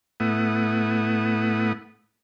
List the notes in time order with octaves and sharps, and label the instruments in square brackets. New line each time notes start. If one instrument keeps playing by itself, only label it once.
[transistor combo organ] A2 A3 B3 E4 F#5 D#6